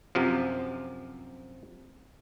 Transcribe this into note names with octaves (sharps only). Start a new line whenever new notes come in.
F#2 C3 F3